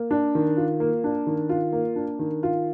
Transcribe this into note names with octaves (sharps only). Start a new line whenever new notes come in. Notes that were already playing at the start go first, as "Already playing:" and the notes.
Already playing: A#3
D4
D#3
F4
A#3
D4
D#3
F4
A#3
D4
D#3
F4